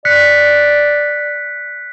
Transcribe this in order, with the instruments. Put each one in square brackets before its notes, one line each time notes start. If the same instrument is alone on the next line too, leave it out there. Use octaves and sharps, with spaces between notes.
[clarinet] D5 [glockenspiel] F#6 B6 C#7